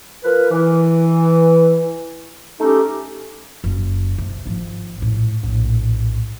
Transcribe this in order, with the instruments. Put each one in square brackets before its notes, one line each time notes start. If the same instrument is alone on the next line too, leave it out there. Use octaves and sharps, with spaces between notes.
[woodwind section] F3 A#4 B4
E3
A3 C#4 D#4 G4 A4
[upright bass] F#1
C3
G#1 F3
A#1 A2
A#1 A2